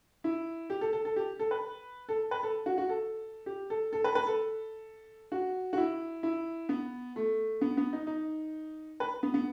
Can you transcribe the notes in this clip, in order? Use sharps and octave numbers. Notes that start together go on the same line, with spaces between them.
E4
G4
A4
A4
A4
G4
A4
B4
A4
B4
A4
F#4
F#4
A4
G4
A4
A4
B4
B4
A4
F#4
F#4
E4
E4
B3
A3
B3
B3
D#4
D#4
B4
B3
B3